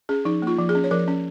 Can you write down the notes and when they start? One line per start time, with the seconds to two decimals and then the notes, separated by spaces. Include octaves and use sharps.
0.09 C#4 G#4
0.25 F3 D#4
0.42 A#3 F4
0.58 F3
0.69 G#4
0.75 C#4
0.84 C#5
0.91 F3 A#4
1.08 C#4